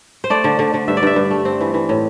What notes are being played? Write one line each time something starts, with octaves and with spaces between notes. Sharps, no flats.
C5
A3 D5
D3
D3
D3
G2 E5
D5
G2 E5
G2
A3
C4
E3
E3
A2